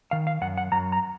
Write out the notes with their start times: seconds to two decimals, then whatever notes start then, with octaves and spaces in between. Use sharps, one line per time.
0.11 D#3 F5
0.27 F5
0.41 F#2 F#5
0.57 F#5
0.72 F#2 A#5
0.92 A#5